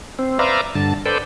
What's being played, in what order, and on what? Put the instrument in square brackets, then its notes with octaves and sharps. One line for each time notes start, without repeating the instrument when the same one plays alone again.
[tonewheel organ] C4
B4 C5 D5 E5 F5 A#5
G2 D3 A5
A4 B4 C5 D5 G5